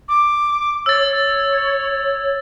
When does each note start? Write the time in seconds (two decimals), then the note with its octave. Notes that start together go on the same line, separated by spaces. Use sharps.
0.08 D6
0.86 C#5 E6 A6